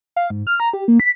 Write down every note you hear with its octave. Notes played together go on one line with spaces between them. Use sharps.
F5
G#2
F6
A#5
G4
A#3
B6